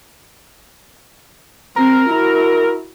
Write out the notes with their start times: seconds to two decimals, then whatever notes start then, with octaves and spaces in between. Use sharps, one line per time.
1.76 C4 A#4
2.09 E4 F#4